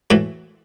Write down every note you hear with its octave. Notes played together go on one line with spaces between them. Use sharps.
A2 E3 F#4